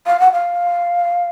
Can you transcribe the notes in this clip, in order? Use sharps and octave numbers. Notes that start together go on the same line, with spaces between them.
F5
F#5
F5